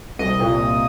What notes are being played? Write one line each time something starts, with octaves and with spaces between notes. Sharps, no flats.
C2 D#5
A#2